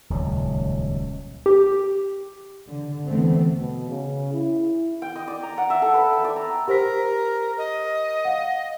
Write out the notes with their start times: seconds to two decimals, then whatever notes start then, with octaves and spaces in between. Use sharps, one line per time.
0.10 D#1 C#2 F#3
1.46 G4
2.66 D3
3.07 E2 D3 E3 A3 B3 C4
3.60 B2
3.90 C#3
4.33 E4
5.02 G5
5.16 D#5
5.28 D5
5.43 A#5
5.58 F#5
5.70 E5
5.82 A4
5.94 B4
6.13 G5
6.24 D5
6.36 A#5
6.68 G4 A#4 C5 B6
7.58 D#5
8.25 F5 F#5